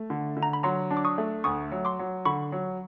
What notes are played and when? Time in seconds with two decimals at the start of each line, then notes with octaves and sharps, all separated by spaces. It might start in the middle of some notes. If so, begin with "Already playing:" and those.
Already playing: A3
0.10 D3
0.37 D3
0.43 A#5
0.53 B5
0.63 F#3 A#5 C6
0.91 D4
0.97 D6
1.05 C#6 D#6
1.18 A3
1.44 D2 C#6 D#6
1.71 F#3
1.85 C6 D6
1.99 F#3
2.25 D3 B5 C#6
2.52 F#3